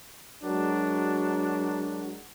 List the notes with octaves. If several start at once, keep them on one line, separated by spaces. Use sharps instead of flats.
F#3 G#3 D4 F#4 A#4